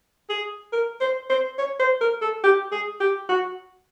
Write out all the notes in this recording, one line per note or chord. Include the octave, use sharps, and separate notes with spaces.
G#4
A#4
C5
C5
C#5
C5
A#4
A4
G4
G#4
G4
F#4